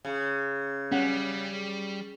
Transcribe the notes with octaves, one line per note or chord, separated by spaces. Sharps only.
C#3
G3 C#4 F#5